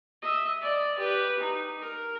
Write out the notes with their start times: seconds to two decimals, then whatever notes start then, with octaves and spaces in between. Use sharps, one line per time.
0.22 D#5 E5
0.61 D5 D#5
0.98 G4 B4
1.39 D#4
1.81 A#4